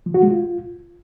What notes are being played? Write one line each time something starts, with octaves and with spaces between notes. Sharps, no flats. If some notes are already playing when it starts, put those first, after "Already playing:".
F3
F#4
G#3
F4